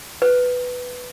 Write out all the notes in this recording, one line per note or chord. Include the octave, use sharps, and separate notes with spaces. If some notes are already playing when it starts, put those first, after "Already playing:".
B4